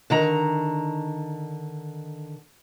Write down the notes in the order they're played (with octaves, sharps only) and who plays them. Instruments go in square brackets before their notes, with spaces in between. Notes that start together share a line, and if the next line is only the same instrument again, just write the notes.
[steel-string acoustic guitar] D3 D#3 A#5